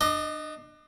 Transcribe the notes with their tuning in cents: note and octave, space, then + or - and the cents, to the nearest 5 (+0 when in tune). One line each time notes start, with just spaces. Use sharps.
D4 +30 D#5 +0